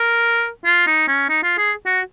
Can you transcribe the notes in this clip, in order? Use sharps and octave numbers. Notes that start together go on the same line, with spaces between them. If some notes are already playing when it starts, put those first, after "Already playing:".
Already playing: A#4
F4
D#4
C#4
D#4
F4
G#4
F#4